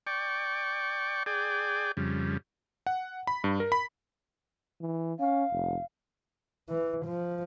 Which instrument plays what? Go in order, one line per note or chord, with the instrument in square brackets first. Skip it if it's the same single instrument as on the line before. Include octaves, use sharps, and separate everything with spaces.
[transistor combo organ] D5 G5 C#6
G#4 D5 G5
F2 C#3 G3
[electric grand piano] F#5
B5
G2
A#4
B5
[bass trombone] E3
[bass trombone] C#4 [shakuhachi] F5
[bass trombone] F1
[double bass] E3
F3